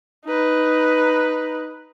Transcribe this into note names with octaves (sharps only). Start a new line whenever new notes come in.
D#4 B4